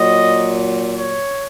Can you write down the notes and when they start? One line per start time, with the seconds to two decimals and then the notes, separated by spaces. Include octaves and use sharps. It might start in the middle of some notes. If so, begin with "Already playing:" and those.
Already playing: A#2 F#3 D#5
0.95 C#5